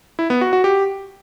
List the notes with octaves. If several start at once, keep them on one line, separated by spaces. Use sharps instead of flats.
E4
B3
F#4
F#4
G4